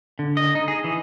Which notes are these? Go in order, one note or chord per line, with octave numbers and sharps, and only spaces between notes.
D3
D#5
D#4
G#4
E3